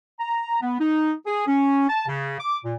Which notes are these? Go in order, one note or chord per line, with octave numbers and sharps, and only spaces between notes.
A#5
B3
D#4
G#4
C#4
A5
C#3
D6
A#2